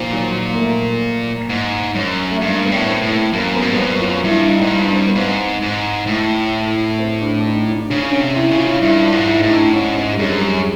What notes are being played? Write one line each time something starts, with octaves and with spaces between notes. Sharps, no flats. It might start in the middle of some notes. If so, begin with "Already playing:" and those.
Already playing: A#2 D#3 F3
F#3
A#3
A3
G#2
F#2
A3
G2 A#3
B3
A2
C4
A2
A3
F#2 A#3
B3
G#2
G2
B3
F#2 C4
F4
G2 E4
D#4
G#2
G2
C4
B3
G#2 C4
G#2
A2
C4
D4
D4
D#4
D4
D4
C#3 C#4
D4
C#4
C3
E4
C#3
F4
G2 E4
F4
G#2
E4
A2 D#4
D4
G#2 C#4
C4
G3
F#2 G#3
G#3
G3